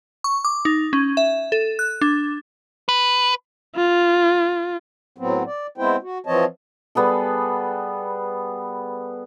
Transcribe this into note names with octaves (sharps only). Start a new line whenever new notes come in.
C#6
D6
D#4
C#4
E5
A4
F#6
D4
B4
F4
A2 F#3 B3 C4
D5
G#3 B3 C4 E4 C5 G5
F#4
E3 F3 C4 C#5 D#5 A5
G3 B3 G#4 A4